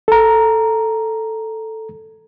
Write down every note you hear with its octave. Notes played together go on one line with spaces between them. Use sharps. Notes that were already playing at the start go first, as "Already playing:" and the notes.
A4 A#5